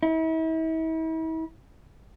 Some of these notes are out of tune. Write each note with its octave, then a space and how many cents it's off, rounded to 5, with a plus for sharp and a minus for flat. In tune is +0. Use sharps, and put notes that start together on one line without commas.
E4 -40